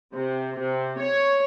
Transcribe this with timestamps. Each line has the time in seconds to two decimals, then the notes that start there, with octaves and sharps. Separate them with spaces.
0.14 C3
0.57 C3
1.01 C#5